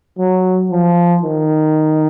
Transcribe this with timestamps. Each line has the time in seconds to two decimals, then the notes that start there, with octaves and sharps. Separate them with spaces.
0.19 F#3
0.70 F3
1.23 D#3